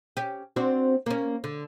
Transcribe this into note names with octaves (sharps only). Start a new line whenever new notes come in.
C#4 G4
C4 D4 F#4
A#3 C#4
D3